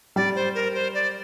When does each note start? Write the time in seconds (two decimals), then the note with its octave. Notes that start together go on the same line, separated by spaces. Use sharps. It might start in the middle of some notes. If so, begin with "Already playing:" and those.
0.16 G3 D5
0.35 C5
0.55 A#4
0.74 C5
0.94 D5